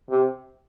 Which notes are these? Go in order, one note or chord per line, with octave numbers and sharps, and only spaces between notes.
C3